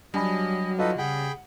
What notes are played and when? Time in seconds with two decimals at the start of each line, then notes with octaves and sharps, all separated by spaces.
0.14 F#3 G3 D4 D#5 G#5 B5
0.79 D#4 F4 F#4 A4 B4 D#5
0.98 C#3 G#4 F#5 G5 B5